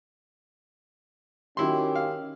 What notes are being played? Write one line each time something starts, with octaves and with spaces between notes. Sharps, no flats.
D#3 F#3 C#4 E4 G4 C6
F5